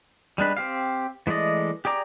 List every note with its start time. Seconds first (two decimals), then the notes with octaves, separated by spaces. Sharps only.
0.38 G3 G#3 D4 B4
0.57 C4 G4 F5
1.27 E3 G#3 A3 D5 D#5
1.85 G4 G#4 D5 A#5 D6